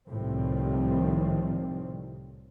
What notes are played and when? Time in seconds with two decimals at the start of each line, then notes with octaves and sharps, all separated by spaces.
0.10 C2 A2 D#3 F3 G3 C4